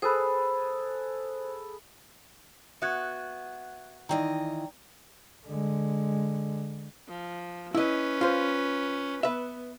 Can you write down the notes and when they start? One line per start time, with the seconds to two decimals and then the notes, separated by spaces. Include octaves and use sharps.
0.02 G#4 A4 B4 C5
2.82 B3 F#4 E5 F#6 G#6
4.09 D#3 E3 D5 D#5 G5 A#5
5.47 D3 G#3
7.08 F3
7.75 C#4 E4 B4 D#5
8.21 F4 C5
9.23 B3 B4 E5